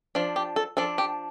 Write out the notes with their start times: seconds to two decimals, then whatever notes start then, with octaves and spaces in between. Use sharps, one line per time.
0.15 F3 D4
0.36 G4
0.56 A4
0.77 F3 D4 A4
0.98 G4